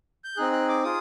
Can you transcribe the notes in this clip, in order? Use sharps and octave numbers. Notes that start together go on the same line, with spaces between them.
G6
C4 D#4 G#4 F#6
F#6
D6
F4 G#4 D#6